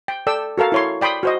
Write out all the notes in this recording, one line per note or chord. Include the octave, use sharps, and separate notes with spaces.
G5
A4 D5 G5 E6
F#4 A4 A#4 F5
E4 C#5 C6
D5 G5 B5 C6 D#6
F#4 C5 D#5